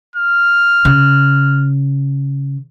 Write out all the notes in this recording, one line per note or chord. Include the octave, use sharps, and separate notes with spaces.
F6
C#3